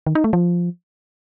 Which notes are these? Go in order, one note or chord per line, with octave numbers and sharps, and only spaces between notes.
D#3
D#4
A3
F3